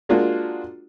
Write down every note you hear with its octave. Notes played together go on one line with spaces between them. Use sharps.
G#3 A#3 D4 F4 F#4